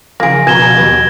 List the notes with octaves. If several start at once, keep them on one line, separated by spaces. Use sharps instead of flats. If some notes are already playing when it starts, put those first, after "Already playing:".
C#3 E3 F3 A#3 G#4 A#6 D7
B2 F3 G#5 A#5 G#6 E7 G7
D#2 F#3 G4 B4